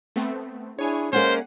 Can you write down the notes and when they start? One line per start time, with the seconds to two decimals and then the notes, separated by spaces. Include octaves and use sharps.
0.16 A3 B3 C4
0.79 D4 E4 G#4 C#5 G#5
1.13 G#3 A#3 C#4 C5 F#5 C7